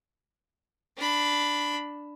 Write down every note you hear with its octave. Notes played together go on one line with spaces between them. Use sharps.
D4 B5